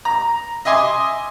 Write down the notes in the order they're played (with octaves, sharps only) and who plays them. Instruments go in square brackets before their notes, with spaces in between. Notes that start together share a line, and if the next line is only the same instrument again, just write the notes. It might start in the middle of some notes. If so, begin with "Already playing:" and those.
[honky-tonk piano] A#5
D#5 E5 G#5 C6 D6 D#6